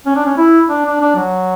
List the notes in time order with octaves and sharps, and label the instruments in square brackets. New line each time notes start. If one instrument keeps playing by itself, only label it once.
[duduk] C#4
D4
C#4
E4
D4
D4
D4
F#3